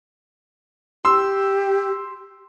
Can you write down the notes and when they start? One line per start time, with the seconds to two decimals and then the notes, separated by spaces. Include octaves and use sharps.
1.05 G4 C6 E6